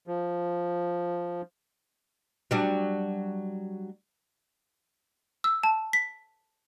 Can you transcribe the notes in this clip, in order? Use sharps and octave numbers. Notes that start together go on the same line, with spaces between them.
F3
F#3 G3 D4
E6
A5
B6